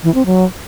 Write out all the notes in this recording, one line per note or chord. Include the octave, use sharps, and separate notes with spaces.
E3
C4
F#3